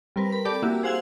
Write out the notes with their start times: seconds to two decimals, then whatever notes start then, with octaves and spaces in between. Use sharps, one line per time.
0.16 G3 C4 A#4 B4
0.32 B5
0.45 G4 A4 D5 A5 D6
0.62 A#3 E4 F#4 G4
0.83 G#4 C5 F5 F#5 E6 G#6